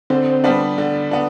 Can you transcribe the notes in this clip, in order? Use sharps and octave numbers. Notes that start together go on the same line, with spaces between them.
D3 C4
G3 B3 D4
D3
B3 D4